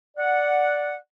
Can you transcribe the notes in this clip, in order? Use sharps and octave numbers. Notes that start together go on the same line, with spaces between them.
D5 F#5